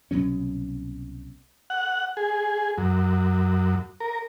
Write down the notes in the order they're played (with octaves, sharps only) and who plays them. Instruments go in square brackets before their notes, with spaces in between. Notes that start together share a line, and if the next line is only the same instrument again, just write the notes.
[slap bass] C2 B2 F#3 C#4
[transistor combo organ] F#5
G#4
F#2
A#4